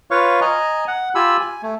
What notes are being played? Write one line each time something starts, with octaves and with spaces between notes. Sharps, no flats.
F4 B4 C#5 F5 C#6
D#5 G#5 A#5
F#5
F4 G4 G#5 B5 E6
G#5
A3